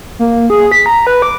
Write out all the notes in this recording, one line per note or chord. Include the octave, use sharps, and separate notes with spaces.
A#3
G#4
B6
A#5
B4
D6